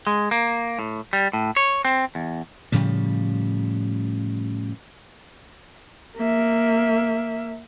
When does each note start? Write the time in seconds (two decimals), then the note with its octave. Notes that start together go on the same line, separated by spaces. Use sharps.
0.07 G#3
0.31 A#3
0.79 A2
1.13 G3
1.33 A2
1.56 C#5
1.85 C4
2.15 E2
2.72 A2 C#3 F3 G3
6.17 A#3 E5